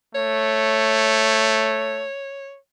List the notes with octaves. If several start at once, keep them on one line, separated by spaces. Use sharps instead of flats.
A3 C#5